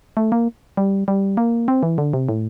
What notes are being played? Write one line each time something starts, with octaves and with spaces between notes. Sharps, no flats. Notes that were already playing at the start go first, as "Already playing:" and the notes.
A3
A#3
G3
G3
A#3
C4
E3
D3
C3
A2